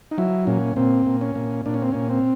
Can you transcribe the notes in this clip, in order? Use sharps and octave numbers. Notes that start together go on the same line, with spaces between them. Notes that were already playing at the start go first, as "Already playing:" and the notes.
D#4
F#3 E4
A#2 C#4
A#2 C4
A#2
C#4
A#2
A#2 D4
C#4
C4
A#2 C#4
C4